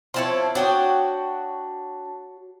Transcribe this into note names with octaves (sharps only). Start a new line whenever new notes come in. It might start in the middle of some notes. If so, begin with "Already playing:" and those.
F3 C4 E4 C#5 A5 C6
D4 F#4 C#5 G5 D#6